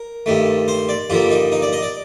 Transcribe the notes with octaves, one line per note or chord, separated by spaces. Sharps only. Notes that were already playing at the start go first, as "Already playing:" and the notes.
Already playing: A#4
G2 D#3 A3
C5
D5
G2 D3 F3 A#3 F4
D#4
D#4
D5
D#5
D5